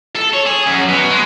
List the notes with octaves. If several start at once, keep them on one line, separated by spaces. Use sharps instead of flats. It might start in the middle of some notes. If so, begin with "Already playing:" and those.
A4
C#5
G#4
F#2
B2
G#3